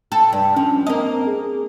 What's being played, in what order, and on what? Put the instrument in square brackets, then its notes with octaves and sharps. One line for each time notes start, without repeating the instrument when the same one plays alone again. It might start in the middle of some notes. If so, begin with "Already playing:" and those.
[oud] A4 [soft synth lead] G5
[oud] G2 C3
[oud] F3 [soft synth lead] C#4
[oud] A#3 D#5 [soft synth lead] C4
[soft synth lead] G#4